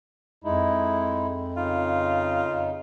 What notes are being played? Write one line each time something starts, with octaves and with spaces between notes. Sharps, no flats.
F2 G#3 D#4 E4
C#3 D#4 F4